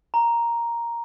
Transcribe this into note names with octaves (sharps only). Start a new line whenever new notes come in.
A#5